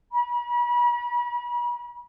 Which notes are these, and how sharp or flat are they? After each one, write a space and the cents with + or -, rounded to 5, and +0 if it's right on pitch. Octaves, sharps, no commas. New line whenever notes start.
B5 -40